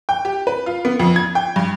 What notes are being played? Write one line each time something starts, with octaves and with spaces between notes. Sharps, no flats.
G5
G4
B4
F4
B3
F2
G#6
G5
G2